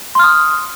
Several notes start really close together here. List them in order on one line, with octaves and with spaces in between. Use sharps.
C6 F6 D#6